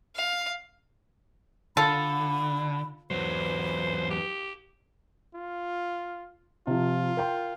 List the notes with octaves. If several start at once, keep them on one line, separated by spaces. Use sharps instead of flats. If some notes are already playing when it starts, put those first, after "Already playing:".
F5
D3 F4 A4 B5
E2 F#3 B4 C5
G4
F4
C3 F3 F4
A#4 G5 C6